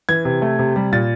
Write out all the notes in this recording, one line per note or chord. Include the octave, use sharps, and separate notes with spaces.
E3 G#6
C3
A3
C3
G3
A#2 A6